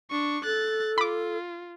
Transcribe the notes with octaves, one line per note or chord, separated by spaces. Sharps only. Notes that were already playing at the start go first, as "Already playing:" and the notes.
D4 C#6
A4 F#6 A6
F4 B5 D6